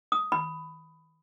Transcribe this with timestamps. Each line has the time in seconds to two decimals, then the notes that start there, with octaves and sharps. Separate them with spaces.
0.12 D#6
0.32 B5